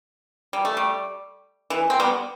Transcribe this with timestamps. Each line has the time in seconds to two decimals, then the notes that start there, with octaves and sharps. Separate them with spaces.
0.53 G3
0.65 A3
0.77 G3
1.70 E3
1.90 C4
2.00 G3 B3